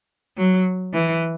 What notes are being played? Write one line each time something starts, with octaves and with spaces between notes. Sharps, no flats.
F#3
E3